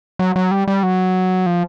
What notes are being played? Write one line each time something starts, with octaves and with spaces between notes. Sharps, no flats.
F#3
F#3
G3
G3
F#3
F3